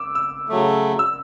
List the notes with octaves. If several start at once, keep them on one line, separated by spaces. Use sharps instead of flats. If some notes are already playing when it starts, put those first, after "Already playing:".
Already playing: D6 E6
E6
C#3 F#3 A3
E6